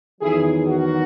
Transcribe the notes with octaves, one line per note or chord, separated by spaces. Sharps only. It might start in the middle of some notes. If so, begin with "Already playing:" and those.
E2 D#3 F#3 E4 G#4
F#4 A#4